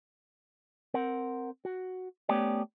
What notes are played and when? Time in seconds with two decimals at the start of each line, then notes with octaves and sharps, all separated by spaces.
0.94 C4 A#4 F#5
1.65 F#4
2.29 A3 B3 C#4 G4 C#5 D5